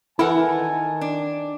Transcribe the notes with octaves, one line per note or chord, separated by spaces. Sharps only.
E3 E4 A4 A#4 F#5 G#5 A5
D#3
D4